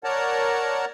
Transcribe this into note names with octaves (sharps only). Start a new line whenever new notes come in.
A#4 C#5 D5 F#5 A5 A#5